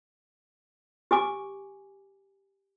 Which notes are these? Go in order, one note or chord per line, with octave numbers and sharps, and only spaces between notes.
G4 G#5 D6